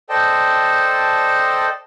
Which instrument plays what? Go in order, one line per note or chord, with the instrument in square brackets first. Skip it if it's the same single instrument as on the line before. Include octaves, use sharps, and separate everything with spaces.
[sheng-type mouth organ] A4 C5 D5 D#5 G5 A5